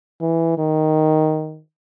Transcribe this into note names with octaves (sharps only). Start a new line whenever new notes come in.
E3
D#3